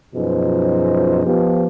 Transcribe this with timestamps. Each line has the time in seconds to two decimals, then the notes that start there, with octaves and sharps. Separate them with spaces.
0.16 F#2 B2 F3 D#4 G#4 C5
1.25 F3 B3 G4